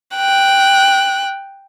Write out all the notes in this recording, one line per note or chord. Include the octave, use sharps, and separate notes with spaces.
G5 F#6